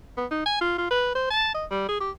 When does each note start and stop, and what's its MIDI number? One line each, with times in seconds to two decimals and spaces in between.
0.17 0.26 59
0.31 0.42 63
0.46 0.58 80
0.61 0.76 65
0.78 0.90 65
0.90 1.12 71
1.15 1.30 72
1.30 1.53 81
1.54 1.65 75
1.70 1.87 55
1.88 2.00 68
2.00 2.11 67